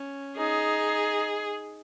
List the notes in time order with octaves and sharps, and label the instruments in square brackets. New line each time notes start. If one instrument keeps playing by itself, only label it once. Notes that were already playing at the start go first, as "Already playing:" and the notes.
Already playing: [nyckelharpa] C#4
[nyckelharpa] D#4 [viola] G#4